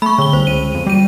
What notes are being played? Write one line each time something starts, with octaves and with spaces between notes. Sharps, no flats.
A3 B5 C#6
D3 G7
C2 C5
C#2 D#7
F2
G3 G#3 D#7